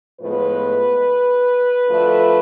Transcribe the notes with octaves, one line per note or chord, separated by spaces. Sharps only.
A2 F3 G#3 B3 B4
D2 D3 F3 A3